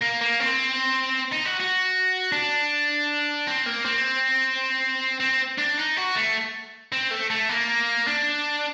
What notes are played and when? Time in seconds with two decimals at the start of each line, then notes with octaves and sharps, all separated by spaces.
0.01 A#3
0.21 A#3
0.40 C4
1.32 D#4
1.45 F#4
1.60 F#4
2.32 D4
3.47 C4
3.66 A#3
3.85 C4
5.20 C4
5.58 D4
5.78 D#4
5.97 F#4
6.16 A3
6.92 C4
7.11 A3
7.30 A3
7.49 A#3
8.07 D4